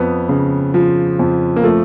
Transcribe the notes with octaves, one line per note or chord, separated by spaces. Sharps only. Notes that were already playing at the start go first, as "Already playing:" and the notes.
Already playing: F2 B3
C#3
F3
F2
A#3
F3 A3